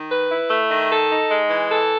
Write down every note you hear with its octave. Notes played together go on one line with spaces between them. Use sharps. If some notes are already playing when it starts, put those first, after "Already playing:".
Already playing: D#3
B4
E4
A3
D#3
A4
D#4
G#3
E3
A4